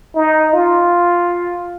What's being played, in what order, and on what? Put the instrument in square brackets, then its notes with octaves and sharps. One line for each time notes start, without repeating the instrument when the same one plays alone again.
[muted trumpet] D#4
F4